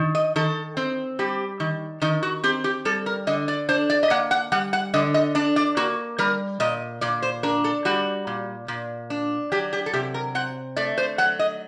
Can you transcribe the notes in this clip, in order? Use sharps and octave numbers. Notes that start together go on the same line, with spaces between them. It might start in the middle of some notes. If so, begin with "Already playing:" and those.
Already playing: D#3
D#5
D#3 A4
C4
G3 G4
D#3
D#3 D#4
F#4
C4 G4
G4
G3 A4
A#4
D3 D#5
D5
D4 C5
D5
D#5
A#3 F#5
F#5
G3 F#5
F#5
D3 D#5
D#5
D4 D5
D5
A#3 F#4
G3 A#4
A#2 D#5
A#2 D5
C5
D4 A#4
A4
G3 F#4
A#2
A#2
D4
F#3 G4
G4
A4
C3 G4
A#4
C4 F#5
A3 D5
C5
F#3 F#5
D#5